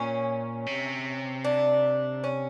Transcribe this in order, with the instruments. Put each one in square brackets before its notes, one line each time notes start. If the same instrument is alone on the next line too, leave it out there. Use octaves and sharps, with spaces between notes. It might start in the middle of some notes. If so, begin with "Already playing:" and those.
Already playing: [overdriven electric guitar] A#2 [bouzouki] C#4
[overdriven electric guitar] C3
[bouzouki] D4
C#4